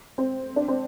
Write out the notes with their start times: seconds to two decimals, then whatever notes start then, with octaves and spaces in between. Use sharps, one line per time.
0.18 C4
0.56 D4
0.68 C4